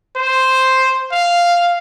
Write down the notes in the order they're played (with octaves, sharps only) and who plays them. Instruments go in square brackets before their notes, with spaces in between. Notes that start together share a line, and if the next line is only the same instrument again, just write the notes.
[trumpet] C5
F5